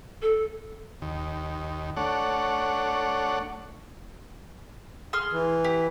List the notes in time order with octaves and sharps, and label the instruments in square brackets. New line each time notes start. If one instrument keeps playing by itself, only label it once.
[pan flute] A4
[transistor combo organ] D#2
A3 D4 C#5 F#5
[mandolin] G#4 C6 F6
[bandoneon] E3
[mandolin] G4